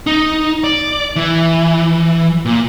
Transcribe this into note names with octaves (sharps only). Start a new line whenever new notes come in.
D#4
D5
E3
A#2